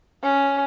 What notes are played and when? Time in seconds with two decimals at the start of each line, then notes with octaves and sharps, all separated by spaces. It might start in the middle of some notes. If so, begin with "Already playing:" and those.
0.23 C#4